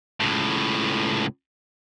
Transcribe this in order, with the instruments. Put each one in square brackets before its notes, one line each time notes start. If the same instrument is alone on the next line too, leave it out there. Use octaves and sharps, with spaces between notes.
[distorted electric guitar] C#2 A2